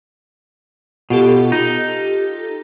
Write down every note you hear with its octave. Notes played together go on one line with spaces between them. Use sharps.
B2 F4 G4 A4
D#4